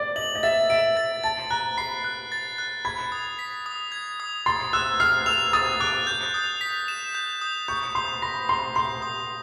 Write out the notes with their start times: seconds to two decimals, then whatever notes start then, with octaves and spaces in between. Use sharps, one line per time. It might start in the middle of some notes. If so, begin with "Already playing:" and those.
Already playing: D5
0.16 D#5 F#7
0.35 D#5
0.43 E5 A6
0.70 E5 D7
0.97 A6
1.24 A5 A6
1.50 A#5 F#6
1.77 B5 C7
2.04 F#6
2.32 A6
2.58 F#6
2.85 B5 G#6
3.12 D#6
3.39 B6
3.66 D#6
3.92 G#6
4.20 D#6
4.46 C6 A6
4.73 E6 F#6
5.00 F6 C7
5.26 E6 F7
5.53 D#6 A6
5.80 D6 F#6
6.07 G6
6.34 D#6
6.61 B6
6.88 E7
7.15 G6
7.41 D#6
7.68 C#6 G6
7.95 C6 D#6
8.22 B5 A#6
8.49 C6 D#6
8.75 C6 G6
9.02 D#6